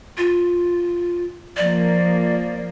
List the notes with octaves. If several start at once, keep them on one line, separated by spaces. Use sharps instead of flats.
F4
F3 A#3 D5